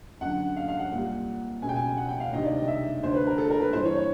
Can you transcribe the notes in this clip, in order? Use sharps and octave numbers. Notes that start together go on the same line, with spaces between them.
F#2 D3 F#5
F5
F5
F#5
C2 A#2
C#2 B2 G#5
G5
G#5
F#5
G5
F5
D2 C3 D#3 D#5
D5
D#5
E5
D2 D3 C5
B4
A#4
A4
A#4
B4
G2 E3 C5
C#5
C#5